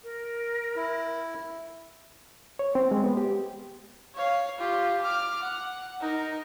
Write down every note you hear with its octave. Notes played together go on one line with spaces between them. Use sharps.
A#4
E4
C#5
C4
G#3
B3
G4
C#5 F5
F4 G4
D6 F6
F#5
D#4 A#4